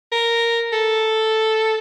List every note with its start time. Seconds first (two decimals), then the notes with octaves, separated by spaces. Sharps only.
0.12 A#4
0.73 A4